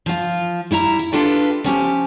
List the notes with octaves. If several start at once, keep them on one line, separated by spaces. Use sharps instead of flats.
F3 F4
G3 E4 E5 A#5
E4
D4 E4 F4 G4 A4 B4
F3 C#4 G4